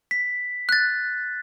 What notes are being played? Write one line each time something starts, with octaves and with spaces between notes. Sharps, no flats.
B6
F#6 A6